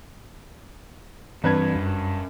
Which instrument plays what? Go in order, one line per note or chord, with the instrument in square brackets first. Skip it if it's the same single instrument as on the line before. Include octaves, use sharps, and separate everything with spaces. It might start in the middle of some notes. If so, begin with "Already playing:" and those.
[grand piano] G2 B4 G#6 [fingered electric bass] E3 C4
[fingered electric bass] F#2